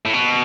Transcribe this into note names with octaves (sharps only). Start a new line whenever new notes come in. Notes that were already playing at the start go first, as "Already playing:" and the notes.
A2
B2